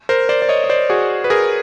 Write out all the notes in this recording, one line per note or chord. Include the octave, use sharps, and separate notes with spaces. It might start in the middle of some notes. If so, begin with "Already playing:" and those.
A#4 C5
C5 D5
D5
C#5 D#5
D#5
C5 D5
F#4 G#4
B4
G#4 A#4